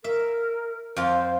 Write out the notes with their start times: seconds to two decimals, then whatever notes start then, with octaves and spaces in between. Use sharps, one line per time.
0.04 A#4 E5
0.96 F2 F4 C5